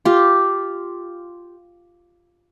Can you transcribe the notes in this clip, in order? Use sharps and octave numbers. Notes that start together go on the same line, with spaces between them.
F4 G4